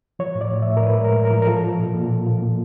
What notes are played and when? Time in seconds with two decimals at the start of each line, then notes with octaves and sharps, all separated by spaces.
0.19 F3 C#5
0.35 A2
0.41 D5
0.51 A2
0.62 A2 E5
0.77 A#4
0.83 A2 B4
0.98 G#3
1.04 A#4
1.15 A2
1.25 A#4
1.31 F3
1.42 A#4
1.46 F3 A4
1.63 F3
1.79 A#2
1.94 A#2
2.11 A#2
2.26 F3
2.42 A#3